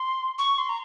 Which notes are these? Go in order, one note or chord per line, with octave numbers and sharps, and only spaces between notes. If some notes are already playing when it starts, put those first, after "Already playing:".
Already playing: C6
C#6
C6
A#5